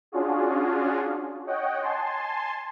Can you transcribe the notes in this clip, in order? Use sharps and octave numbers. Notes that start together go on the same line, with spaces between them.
C#4 D4 F4 F#4 G#4
C#5 D#5 F#5 G5
G#5 A5 C6